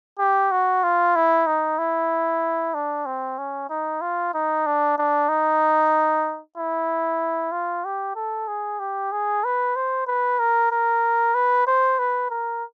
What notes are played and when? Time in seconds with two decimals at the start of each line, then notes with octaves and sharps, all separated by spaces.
0.19 G4
0.51 F#4
0.84 F4
1.15 E4
1.46 D#4
1.78 E4
2.74 D4
3.06 C4
3.39 C#4
3.70 D#4
4.01 F4
4.34 D#4
4.66 D4
4.98 D4
5.29 D#4
6.58 E4
7.52 F4
7.85 G4
8.16 A4
8.48 G#4
8.79 G4
9.12 G#4
9.44 B4
9.76 C5
10.07 B4
10.39 A#4
10.71 A#4
11.34 B4
11.67 C5
11.99 B4
12.30 A#4